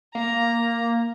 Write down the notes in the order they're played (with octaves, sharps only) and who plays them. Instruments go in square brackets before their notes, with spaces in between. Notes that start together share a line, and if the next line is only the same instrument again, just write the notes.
[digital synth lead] A#3 [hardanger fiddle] A#5